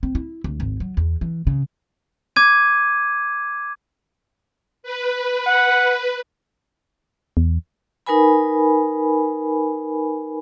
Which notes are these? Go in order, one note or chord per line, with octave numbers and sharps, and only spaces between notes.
C4
E4
D2
G#1
F#3
E2
E3
C#3
D6 G#6 D#7
B4
F#5
E2
D#4 A#4 B4 G#5 B5